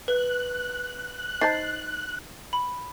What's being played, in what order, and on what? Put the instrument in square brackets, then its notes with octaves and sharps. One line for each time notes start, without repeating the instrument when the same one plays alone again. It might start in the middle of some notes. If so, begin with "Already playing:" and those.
[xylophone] B4 [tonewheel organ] F#6
[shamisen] D#4 C5 A5 [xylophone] A6 C7
[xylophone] B5